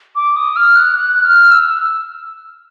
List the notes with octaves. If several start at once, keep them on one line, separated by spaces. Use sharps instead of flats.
D6
D#6
F6
F#6
F#6
F6
E6